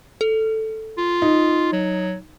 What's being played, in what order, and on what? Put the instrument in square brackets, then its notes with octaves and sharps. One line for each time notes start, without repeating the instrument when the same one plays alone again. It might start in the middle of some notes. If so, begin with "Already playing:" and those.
[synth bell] A4
[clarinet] F4
[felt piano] D#4
[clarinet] F#3